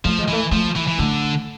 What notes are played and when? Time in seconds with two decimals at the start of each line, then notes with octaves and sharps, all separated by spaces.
0.05 F3 A3
0.19 G#3
0.28 E3 A3
0.52 F3 A3
0.76 E3
0.88 E3
0.99 D3 A3